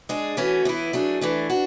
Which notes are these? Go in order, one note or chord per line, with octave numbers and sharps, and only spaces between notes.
G#3 D4 G#4
E3 A3 C#4 F#4
E3 B3 E4
F#3 A3 D4 G#4
E3 A3 D4
D4 F#4